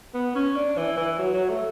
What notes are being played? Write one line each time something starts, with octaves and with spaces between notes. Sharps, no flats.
B3
C#4
D4
E3
E3
F#3
F#3
A3